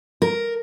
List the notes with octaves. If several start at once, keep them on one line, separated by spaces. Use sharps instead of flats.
A#4